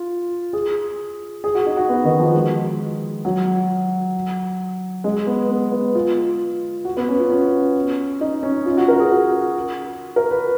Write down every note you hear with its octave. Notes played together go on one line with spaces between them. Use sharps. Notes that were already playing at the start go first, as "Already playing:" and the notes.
Already playing: F4
G#4
G#4
F#4
D#4
F#4
B3
D#3
F3
G#3
F#3
G#3
B3
B3
B3
F4
F#4
B3
C#4
F4
C#4
D#4
C#4
F4
F#4
A#4
G#4
F#4
A#4
B4